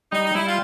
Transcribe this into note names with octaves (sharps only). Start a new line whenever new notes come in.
G3 D#4
D#4
G3 E4
F4